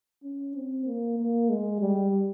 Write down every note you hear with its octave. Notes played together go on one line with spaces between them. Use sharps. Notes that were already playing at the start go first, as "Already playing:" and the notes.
C#4
C4
A#3
A#3
G#3
G3